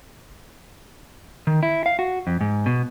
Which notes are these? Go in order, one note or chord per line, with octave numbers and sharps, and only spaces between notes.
D#3
E4
F5
F#4
F2
G#2
B2